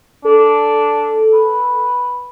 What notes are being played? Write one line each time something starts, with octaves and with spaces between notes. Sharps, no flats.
D4 A4
B4